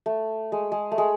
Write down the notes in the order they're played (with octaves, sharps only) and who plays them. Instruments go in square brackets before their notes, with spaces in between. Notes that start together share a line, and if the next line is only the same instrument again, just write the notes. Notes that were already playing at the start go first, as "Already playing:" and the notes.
[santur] A3
G#3
G#3
A3
G#3